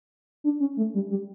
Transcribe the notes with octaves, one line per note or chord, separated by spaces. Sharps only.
D4
C#4
A3
G3
G3